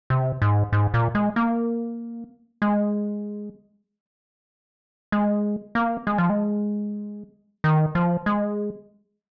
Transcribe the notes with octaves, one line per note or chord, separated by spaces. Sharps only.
C3
G#2
G#2
A#2
G#3
A#3
G#3
G#3
A#3
G#3
F3
G#3
D#3
F3
G#3